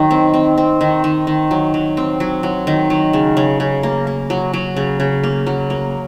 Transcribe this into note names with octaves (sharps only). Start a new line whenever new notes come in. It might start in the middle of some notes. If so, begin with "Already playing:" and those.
Already playing: D#3 F#3
C4
C4
C4
D#3
D#3
D#3
F#3
F#3
C4
F#3
F#3
D#3
F#3
C#3
C#3
C#3
A#3
A#3
F#3
F#3
C#3
C#3
A#3
F#3
A#3